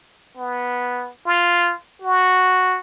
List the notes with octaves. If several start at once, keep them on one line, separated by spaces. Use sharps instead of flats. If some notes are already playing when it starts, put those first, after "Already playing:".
B3
F4
F#4